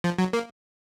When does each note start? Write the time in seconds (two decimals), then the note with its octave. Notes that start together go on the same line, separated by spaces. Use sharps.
0.04 F3
0.18 F#3
0.33 A#3